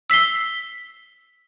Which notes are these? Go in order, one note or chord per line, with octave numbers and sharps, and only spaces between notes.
E6 B6 C7 G7